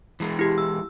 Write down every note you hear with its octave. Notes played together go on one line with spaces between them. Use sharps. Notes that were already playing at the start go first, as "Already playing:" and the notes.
E3 G#3
E4 G4
E6